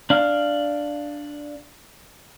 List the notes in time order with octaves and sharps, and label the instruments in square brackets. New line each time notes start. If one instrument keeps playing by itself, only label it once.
[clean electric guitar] D4 F5